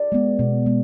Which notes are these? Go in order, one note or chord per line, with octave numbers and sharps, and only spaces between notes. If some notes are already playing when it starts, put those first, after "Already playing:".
Already playing: D5
G#3 B3
B2
G#3 B3